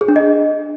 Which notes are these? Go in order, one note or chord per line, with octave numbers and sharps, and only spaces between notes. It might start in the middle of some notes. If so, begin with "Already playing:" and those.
G#4
D4
D#5